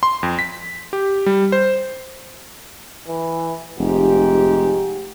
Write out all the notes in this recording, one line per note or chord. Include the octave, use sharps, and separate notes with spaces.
C6
F2
B6
G4
G3
C5
E3
F1 G#2 G4